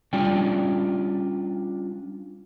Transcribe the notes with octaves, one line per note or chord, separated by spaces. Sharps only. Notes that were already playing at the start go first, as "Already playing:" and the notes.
G3 C#4 D4 F4 D5 G5